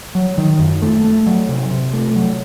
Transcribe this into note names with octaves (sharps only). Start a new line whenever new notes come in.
F#3
D#3
F#2
A3
A3
F#3
C3
C3
A3
F#3